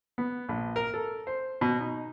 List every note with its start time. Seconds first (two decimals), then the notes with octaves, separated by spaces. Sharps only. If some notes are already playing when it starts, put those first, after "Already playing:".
0.18 B3
0.49 A#1
0.76 A#4
0.94 A4
1.27 C5
1.61 B2
1.79 D#4